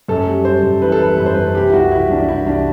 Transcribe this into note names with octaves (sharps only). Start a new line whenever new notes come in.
F#2 A4
G3
G3 C5
F#2
E3 B4
A4
G3 B4
F#2 B4
C5
F#2 B4
C3 G4
E4
C2 F#4
E3 E4
C2 D4
D4
E3 E4
C2 D4